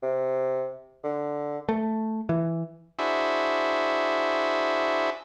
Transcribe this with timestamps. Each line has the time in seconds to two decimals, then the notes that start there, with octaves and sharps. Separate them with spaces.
0.02 C3
1.04 D3
1.69 A3
2.29 E3
2.99 D4 E4 F#4 G#4 C5 E5